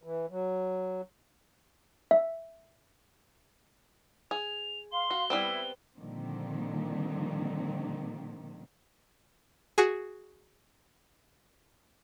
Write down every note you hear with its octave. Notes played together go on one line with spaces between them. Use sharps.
E3
F#3
E5
G#4 F7
F5 C6 G7
F#4
G3 B3 C4 E4
A#2 D3 D#3 F3 G3 C4
F#4 G#4